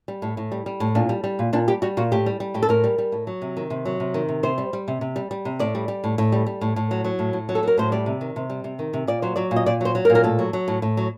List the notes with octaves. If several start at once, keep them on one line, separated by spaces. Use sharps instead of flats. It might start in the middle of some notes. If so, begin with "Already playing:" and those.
G3
A2
A2
G3
G3
A2
A#2 D4
G3
G3
A#2
A#2 D4
G3 G4
G3 F#4
A#2 F#4
A2 G4
G3
G3
A2 G4
A4
A2 A#4
G3
G3
A2
F#3
C3
D#3
C3
F#3
C3
D#3
C3
C3 C5
G3
G3
C3
C3
G3
G3
C3
A2 D5
G3
G3
A2
A2
G3
G3
A2
A2
F#3
F#3
A2
A2
F#3
A4
F#3 A#4
A2 C5
G3 D5
C3
D#3
C3
G3
C3
D#3
C3
A#2 D5
F#3 C5
F#3 D5
A#2
D#5
A#2 D5
F#3 C5
F#3
A#4
A#2
A#4
A2 A4
F#3
F#3
A2
A2
F#3